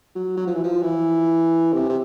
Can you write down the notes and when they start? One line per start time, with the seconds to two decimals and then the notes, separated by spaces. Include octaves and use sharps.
0.15 F#3
0.37 F#3
0.47 F3
0.55 E3
0.63 F3
0.83 E3
1.74 C3
1.89 C3